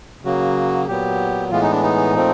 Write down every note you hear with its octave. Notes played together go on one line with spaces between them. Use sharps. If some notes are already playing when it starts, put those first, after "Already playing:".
C#3 F#3 A#3 F#4
A#2 F#3 B3 G4
A2 E3 G#3 B3 F4
D#4
D4
D#4
A#2 F3 A3 C4